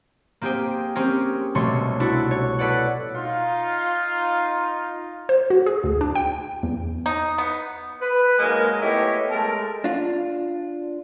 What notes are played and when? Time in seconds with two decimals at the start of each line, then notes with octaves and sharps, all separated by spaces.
0.41 A#3 C4 G4 G#4 C5 G5
0.95 C4 C#4 G4 G#4 A#4
1.55 C2 B2 A3 C#5 C6
2.00 D4 E4 F#4 A4
2.31 C#5
2.59 F#4 A4 B4 D5 F#5
3.15 D#4 F4
5.29 C5
5.50 F#4
5.66 G#4
5.84 D2
6.01 D4
6.15 G5
6.63 E2
7.06 D#4
7.38 B3
8.01 B4
8.39 G#2 F#3 G#3 A#3 A#4 G#5
8.81 A3 B3 E4 G4 C#5 D#5
9.30 G#3 A3 A#4 A5
9.84 D4 F4